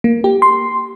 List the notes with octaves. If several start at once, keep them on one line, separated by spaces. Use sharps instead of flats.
A#3
G4
C6